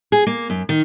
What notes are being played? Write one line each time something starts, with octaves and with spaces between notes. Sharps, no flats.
G#4
A#3
F#2
D#3